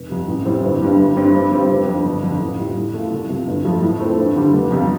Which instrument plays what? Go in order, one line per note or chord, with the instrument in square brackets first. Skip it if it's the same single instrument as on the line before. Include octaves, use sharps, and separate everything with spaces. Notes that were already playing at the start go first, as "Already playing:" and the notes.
Already playing: [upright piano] F1
F2 C3 G3
A1
A2 G3 C4
G1
G2 G3 D4
G1
G2 G3 C4
G2
G3 C4 F4
F1
F2 F3 D4
G1
F2 D3
A1
A2 G3 F4
A2
A3 F4
C2
C3 G3 F4
G1
F2 F3 A3
A2
A3 C4
G2
D3 G3
F1
F2 C3 G3 F4